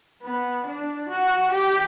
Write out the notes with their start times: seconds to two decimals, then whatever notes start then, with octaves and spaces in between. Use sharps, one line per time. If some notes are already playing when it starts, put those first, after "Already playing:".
0.23 B3
0.66 D4
1.09 F#4
1.52 G4